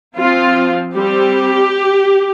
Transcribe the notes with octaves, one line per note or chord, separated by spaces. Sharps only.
F3 C4 F4
G3 C4 G4